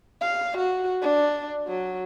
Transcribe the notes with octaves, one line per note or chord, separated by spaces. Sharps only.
F5
F#4
D4
F#3